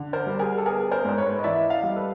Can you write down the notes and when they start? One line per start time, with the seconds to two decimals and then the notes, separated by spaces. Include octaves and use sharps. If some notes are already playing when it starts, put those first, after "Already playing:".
Already playing: D3
0.13 A#4 C5
0.26 G3
0.39 G#4 A#4
0.58 A4
0.66 B3 G#4 A#4
0.91 A#4 C5
1.05 G#2 C5
1.18 B4 C#5
1.39 D#5
1.44 E3 D5 E5
1.70 D#5 F5
1.83 G3
1.96 A4 B4